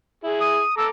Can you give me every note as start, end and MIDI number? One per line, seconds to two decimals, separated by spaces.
0.24 0.61 64
0.24 0.61 68
0.40 0.75 87
0.78 0.88 69
0.78 0.88 82
0.78 0.88 86
0.78 0.85 88